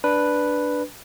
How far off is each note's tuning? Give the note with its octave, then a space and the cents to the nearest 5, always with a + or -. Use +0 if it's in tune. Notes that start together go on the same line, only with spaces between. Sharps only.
D4 +0 B4 +0